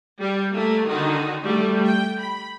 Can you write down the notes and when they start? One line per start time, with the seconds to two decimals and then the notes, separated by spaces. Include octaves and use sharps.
0.20 G3
0.52 A3 A#3
0.87 D3 D#3 D#4 F#4
1.45 G3 A3
1.85 G5
2.19 B5